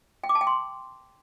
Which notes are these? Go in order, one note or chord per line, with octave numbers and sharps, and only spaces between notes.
G5
D6
A5
G5
C6